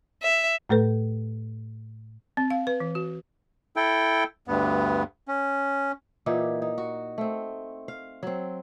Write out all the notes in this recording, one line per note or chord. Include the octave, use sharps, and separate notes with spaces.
E5
A2 A3 A4 B4
C4
F5
B4
E3
F#4
E4 A4 G5
D2 G2 B3
C#4
A#2 E3 D#4 G4
D#4
F#4
A3 C4
F5
F#3 C4